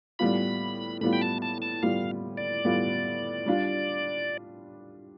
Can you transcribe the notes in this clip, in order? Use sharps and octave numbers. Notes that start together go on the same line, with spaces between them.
A2 G3 B3 F4 B5
A2 G3 B3 F4 B5
G5
A5
A5
A5
A2 G3 B3 F4 F5
D5
A2 G3 B3 F4
G3 D4 F4